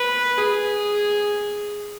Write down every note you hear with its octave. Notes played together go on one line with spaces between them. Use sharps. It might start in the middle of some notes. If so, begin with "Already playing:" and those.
Already playing: B4
G#4